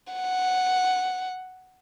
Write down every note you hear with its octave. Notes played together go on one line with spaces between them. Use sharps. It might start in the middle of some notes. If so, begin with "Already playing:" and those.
F#5